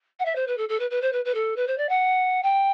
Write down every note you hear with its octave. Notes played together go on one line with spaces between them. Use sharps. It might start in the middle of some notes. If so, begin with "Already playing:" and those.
F#5
E5
C5
B4
A4
A4
B4
B4
C5
B4
B4
A4
B4
C5
D5
F#5
G5